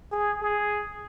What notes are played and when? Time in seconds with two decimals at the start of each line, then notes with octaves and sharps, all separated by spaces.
0.12 G#4
0.41 G#4